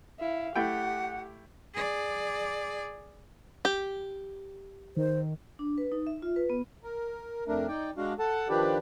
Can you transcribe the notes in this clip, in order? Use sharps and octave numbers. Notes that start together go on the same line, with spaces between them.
E4 F5
A3 E4 G4 F#5 G5
G#4 D5
G4
D#3 C5
D4
B4
D#4
E5
F4
B4
B3
A#4
F2 A3 D4 A#4
D#4 D5 G5
G#3 D4 F#4 F5
A4 F#5 A5
D#3 F3 D4 G4 B4 D5